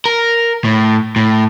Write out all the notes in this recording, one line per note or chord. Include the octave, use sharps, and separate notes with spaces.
A#4
A2
A2